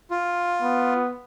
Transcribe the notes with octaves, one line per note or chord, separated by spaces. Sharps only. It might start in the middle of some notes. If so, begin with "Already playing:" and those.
F4
B3